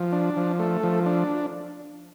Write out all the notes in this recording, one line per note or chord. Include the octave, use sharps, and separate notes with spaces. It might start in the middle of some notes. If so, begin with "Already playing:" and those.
Already playing: F3
D4
F3
A3
F3
D4